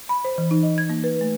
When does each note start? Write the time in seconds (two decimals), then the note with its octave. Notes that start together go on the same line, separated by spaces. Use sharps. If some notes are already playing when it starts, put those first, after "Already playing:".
0.09 B5
0.25 C5
0.38 E3
0.51 D#4
0.63 D#5
0.78 G#6
0.90 A#3
1.04 B4
1.21 A3